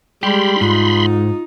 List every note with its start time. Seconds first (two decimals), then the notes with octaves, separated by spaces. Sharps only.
0.23 G3 G#3 G4 B5 C6
0.61 G#2 D#4 F4